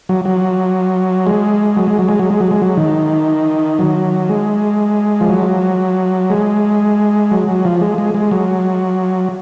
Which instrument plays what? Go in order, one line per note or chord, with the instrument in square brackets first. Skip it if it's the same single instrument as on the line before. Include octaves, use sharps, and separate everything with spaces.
[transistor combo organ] F#3
F#3
G#3
F#3
G#3
F#3
G#3
F#3
G#3
F#3
G#3
F#3
D#3
F#3
G#3
F3
F#3
G#3
F#3
F#3
F3
G#3
G#3
G#3
F#3